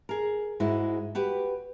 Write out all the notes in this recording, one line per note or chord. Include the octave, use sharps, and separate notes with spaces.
G#4 A#4
G#2 G#3 E4 F#4
F#4 G4 B4